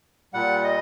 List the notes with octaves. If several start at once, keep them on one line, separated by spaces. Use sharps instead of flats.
A#2 G3 F#5
D#5